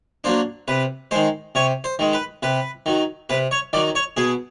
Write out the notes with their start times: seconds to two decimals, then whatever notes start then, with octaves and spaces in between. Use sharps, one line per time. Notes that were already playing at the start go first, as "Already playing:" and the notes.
0.24 F#3 A#3 D4 C5
0.68 C3 B4
1.11 D#3 G#3 C5
1.55 C3 C#5
1.84 C5
1.99 D#3 G#3
2.13 B4
2.43 C3 B4
2.86 D#3 F#3
3.30 C3 B4
3.51 C#5
3.73 D#3 D5
3.76 F#3
3.95 C#5
4.17 B2 G#4